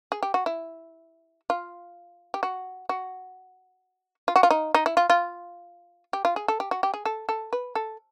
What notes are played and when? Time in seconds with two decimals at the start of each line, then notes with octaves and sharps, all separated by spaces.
0.12 G#4
0.23 G4
0.34 F#4
0.46 E4
1.50 F4
2.34 G4
2.43 F#4
2.89 F#4
4.28 F4
4.36 F#4
4.43 F4
4.50 D#4
4.74 D#4
4.86 E4
4.97 F4
5.10 F4
6.13 G4
6.25 F4
6.36 G#4
6.48 A4
6.60 G4
6.71 F#4
6.83 G4
6.94 G#4
7.05 A4
7.29 A4
7.53 B4
7.75 A4